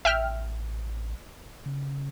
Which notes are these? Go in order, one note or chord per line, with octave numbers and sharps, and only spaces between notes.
A1 E5 G5 F6
C#3